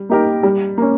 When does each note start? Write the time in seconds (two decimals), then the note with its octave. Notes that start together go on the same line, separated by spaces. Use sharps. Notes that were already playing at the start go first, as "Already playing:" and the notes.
Already playing: G3
0.09 A#3 D#4 G4 A#4
0.43 G3
0.78 A#3 C#4